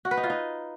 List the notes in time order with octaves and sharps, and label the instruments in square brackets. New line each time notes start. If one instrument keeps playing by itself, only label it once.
[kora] F#4
B4
D#4
F4
D#4